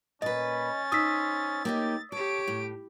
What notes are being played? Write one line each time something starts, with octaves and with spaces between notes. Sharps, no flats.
A#2 C#4 B4 D#5 A6
D#4 C5 D#6 E6 B6
A#3 C#4 D#4 G4
G4 A4 C#5 D7
A2